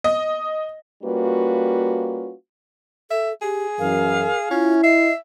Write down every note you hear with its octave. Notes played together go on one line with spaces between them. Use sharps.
D#5
G3 A#3 C#4 F4 F#4 B4
A4 E5
G4 G#4
F#2 E3 A#4 F5
C#4 E4 F4
D#5 E5 C7